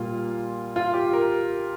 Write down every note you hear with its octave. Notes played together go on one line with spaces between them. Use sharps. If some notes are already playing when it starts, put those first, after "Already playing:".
Already playing: A#2 G3 A#3 F4
F4
G4
A#4